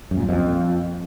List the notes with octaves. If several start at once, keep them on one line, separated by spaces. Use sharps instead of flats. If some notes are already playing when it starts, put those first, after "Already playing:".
F#2
A#2
F#2
F2